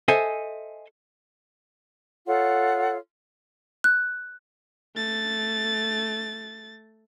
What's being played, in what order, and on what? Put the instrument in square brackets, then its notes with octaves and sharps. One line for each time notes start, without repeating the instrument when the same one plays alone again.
[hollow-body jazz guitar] A4 C5 D#5 E5 G#5
[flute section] F4 A4 C#5 F#5
[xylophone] F#6
[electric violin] A3 A6